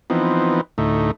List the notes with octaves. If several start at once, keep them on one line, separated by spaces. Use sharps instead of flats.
E3 F3 B3 C4 D#4
D2 A2 A3 D#4